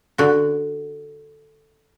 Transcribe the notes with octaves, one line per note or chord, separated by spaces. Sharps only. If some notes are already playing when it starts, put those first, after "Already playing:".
D3 F#4